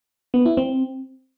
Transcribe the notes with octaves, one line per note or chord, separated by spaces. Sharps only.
B3
E4
C4